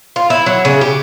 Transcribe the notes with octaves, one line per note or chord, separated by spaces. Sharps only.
F4
E4
F#3
C#3
G4